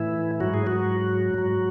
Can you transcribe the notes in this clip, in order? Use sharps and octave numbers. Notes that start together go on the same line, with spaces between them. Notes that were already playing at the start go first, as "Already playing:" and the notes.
Already playing: A2 E3 E4
G#2 F#3 F#4
G#4
F#3 F#4
G#2 F#3